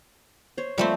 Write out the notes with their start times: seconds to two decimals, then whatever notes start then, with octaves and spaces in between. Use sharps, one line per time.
0.57 C5 C#5
0.78 F3 G3 A3 A#3 C4